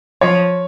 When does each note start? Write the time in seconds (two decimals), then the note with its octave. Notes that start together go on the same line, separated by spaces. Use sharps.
0.21 F3 C#5